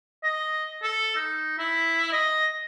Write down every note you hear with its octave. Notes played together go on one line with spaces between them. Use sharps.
D#5
A4
D#4
E4
D#5